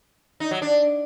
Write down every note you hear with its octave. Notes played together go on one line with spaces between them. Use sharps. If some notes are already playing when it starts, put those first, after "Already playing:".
D#4
F#3
D4